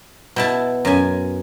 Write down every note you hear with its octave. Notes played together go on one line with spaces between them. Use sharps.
B2 E4 A5
F#2 G#5